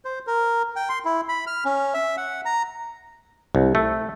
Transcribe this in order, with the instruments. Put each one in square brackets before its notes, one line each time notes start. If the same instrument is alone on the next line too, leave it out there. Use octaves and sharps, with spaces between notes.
[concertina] C5
A#4
G5
C6
E4
B5
F6
C#4
E5
F#5
A#5
[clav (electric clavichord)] C2
A3